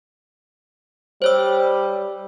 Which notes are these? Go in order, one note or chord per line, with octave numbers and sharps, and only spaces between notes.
G3 C5 C#5 E6